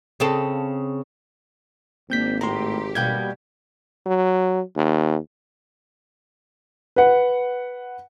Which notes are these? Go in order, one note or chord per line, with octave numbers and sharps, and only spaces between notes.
C#3 C4 A4
G#1 A#3 C4 D4 G6 B6
A2 G4 A#5 C6
B2 G3 A#3 G5 G6 G#6
F#3
D#2
B4 F#5